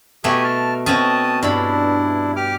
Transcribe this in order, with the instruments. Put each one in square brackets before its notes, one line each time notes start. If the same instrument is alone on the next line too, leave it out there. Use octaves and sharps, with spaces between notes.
[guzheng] B2 A3 [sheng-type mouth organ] G4 G#5 D#6
[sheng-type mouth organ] A5 F6
[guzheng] B2 C4 C#4 [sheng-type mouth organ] A5 D#6
[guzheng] G2 B5 [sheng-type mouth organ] D4 E4
[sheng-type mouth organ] G4 D6 F6